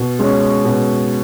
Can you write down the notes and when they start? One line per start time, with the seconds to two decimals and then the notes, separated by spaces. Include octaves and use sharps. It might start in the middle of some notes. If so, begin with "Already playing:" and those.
Already playing: B2
0.19 G#3 C#4
0.65 B2